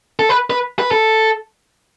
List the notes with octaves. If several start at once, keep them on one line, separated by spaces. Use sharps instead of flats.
A4
B4
B4
B4
A4